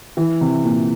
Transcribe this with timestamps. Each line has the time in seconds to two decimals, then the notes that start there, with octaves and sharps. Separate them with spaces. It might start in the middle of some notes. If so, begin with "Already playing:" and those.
0.17 E3
0.41 C3
0.65 A#2